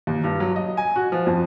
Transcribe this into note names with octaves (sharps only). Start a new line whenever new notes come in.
D#2
G2
F#3
D#5
G#5
F#4
F3
F2